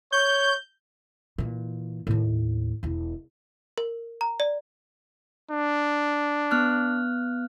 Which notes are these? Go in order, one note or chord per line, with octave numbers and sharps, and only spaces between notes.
C#5 G6
A#2 E3
D#2 A2
E1 E4
A#4
A#5
D5
D4
B3 F6 F#6